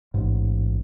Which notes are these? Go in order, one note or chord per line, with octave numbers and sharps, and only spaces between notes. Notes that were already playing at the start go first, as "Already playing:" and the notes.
A1 G#2